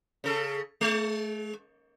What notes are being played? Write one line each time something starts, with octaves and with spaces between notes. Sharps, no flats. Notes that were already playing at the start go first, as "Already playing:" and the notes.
C#3 A4
G#3